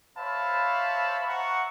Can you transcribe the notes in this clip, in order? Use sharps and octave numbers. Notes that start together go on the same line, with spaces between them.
C5 C#5 E5 F5 A5 B5
E5 F#5 A#5 C#6